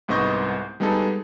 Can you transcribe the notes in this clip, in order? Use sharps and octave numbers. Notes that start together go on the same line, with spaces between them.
C2 G#2 B3 D#5 C#6 G6
G3 G#3 B3 D#4 G#4 A4